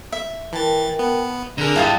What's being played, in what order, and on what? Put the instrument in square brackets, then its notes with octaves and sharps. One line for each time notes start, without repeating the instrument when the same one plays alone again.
[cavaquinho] E5
[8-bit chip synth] E3 A6 [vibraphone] A#4 G5 A5
[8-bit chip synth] B3
[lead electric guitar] D3 [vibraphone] C4 G#4 G#5 [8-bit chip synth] A#4 A#5
[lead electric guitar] G2 [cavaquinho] E4 F4 D#5 [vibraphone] G5